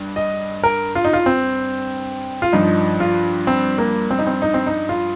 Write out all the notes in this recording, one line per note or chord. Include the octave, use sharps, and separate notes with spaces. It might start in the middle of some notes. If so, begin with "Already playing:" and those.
Already playing: G2
D#5
A#4
F4
D#4
F4
C4
F4
G2 F3 D#4
F4
C4
A#3
C4
D#4
C4
D#4
C4
D#4
F4